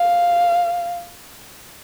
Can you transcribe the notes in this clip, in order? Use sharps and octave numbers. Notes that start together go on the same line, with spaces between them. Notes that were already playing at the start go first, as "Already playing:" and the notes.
Already playing: F5